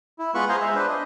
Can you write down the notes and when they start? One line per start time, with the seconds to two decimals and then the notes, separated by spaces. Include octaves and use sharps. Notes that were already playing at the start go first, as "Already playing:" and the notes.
0.19 E4
0.35 G#3 B3 F4 B4 B5 C#6
0.49 G#4 C5 F5 G#5 A#5 C6
0.61 G#3 E5
0.75 D4 B4 C5
0.88 D#5